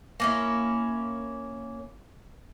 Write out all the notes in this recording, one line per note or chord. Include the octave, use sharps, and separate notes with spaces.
A#3 C#4 E4